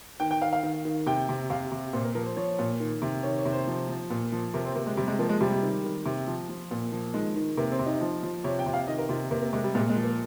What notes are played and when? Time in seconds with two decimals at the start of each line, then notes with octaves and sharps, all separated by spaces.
0.20 D#3 G5
0.31 G5
0.41 D#3 F5
0.53 F5
0.63 D#3
0.85 D#3
1.06 C3 G5
1.29 C3
1.50 C3 F5
1.72 C3
1.93 A#2 C5
2.04 A#4
2.15 F3 A#4
2.26 C5
2.37 F3 C#5
2.59 A#2
2.80 D#3
3.02 C3
3.23 D#3 C#5
3.38 C#5
3.45 C3
3.52 C5
3.67 F3
3.89 F3
4.10 A#2
4.32 F3
4.54 C3 A#4
4.65 C4
4.75 C3 A#3
4.86 G#3
4.97 C3 G3
5.08 G#3
5.19 F3 A#3
5.29 G#3
5.41 C3 G3
5.63 D#3
5.84 D#3
6.05 C3
6.27 F3
6.49 F3
6.71 A#2
6.92 F3
7.14 D#3 G#3
7.36 D#3
7.57 C3 A#3
7.72 C4
7.79 C3
7.86 D#4
8.01 F3
8.23 F3
8.44 C3 C#5
8.59 G5
8.66 C3
8.74 F5
8.87 D#3 D#5
8.98 A#4
9.09 C3 F4
9.31 C3 A#3
9.42 A#3
9.53 C3 G#3
9.64 G3
9.74 A#2 G#3
9.89 G#3
9.96 F3
10.03 A#3